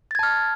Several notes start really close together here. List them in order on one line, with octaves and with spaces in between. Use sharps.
A6 G#6 A5 F6